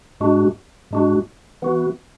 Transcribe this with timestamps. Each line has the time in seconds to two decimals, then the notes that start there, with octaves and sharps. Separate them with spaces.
0.20 G#2 G#3 D4 F#4
0.91 G#2 G#3 D4 F#4
1.62 E3 B3 F#4